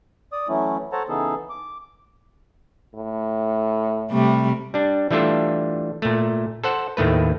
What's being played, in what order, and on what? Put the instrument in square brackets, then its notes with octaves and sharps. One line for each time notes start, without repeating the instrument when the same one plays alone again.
[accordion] D5 D#6
E3 F#3 A3 C#4 E4
A4 C5 C#5 F#5 A5 A#5
C#3 E3 B3 D#4 G#4 A4
D6
[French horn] A2
[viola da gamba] C3 G3 A3
[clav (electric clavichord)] G3 D4
E3 G3 A3 D4 F4 A4
A#2 A3
A4 C5 F#5
D#2 A2 D#3 A3 B4